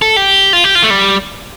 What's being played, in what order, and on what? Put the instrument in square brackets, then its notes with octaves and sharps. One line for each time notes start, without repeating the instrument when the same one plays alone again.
[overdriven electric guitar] A4
G4
F4
G4
F4
A3
G3